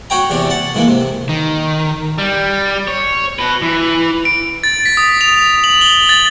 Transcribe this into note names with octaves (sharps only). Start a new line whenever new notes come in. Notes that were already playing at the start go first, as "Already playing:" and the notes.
F#4 C#5 G5 A#5
E2 C3 D4
F#5 A5
G#2 E3 A#3
C3
D#3
G3
C#5
F#4 B4
E3
D7
A6
B6
D#6
F7
F#7
G7
A6